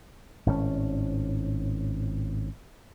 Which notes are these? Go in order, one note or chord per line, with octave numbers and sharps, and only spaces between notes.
G#1 A2 D#3 C#4